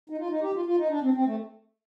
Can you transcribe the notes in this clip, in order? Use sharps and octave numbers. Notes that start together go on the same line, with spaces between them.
D#4
F4
D#4
G4
F4
F4
D#4
D4
C4
C4
A3